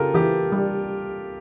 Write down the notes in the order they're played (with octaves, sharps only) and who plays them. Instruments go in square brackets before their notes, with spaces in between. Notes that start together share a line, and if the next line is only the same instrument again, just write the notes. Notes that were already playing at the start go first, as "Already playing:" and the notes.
Already playing: [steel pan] C#3 [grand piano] F4 G4 A4 A#4
[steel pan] E3 [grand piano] G4
[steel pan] G3